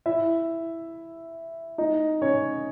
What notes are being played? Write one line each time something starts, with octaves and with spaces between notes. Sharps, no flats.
E4 E5
D#4 D#5
C#4 C#5